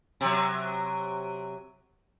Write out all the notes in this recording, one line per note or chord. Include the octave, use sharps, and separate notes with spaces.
C3 F#3